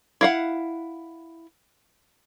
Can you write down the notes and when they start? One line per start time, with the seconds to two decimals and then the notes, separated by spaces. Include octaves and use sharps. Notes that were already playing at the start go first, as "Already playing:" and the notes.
0.21 E4 F5 F#5